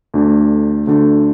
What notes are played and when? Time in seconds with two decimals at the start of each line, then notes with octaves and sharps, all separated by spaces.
0.14 D2 D3 A3 D4
0.87 D2 D3 A3 D4